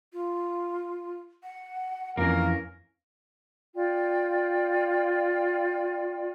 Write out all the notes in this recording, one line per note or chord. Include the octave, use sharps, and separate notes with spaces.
F4
F#5
F2 E3 A#3 C#4 A#4
F4 D5 G5